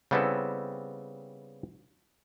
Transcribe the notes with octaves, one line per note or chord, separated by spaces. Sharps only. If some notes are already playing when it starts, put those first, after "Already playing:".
C#3 G3 B3 C4 E4 A4